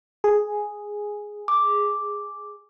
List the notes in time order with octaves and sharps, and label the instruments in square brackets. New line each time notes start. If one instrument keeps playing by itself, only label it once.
[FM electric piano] G#4
[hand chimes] D6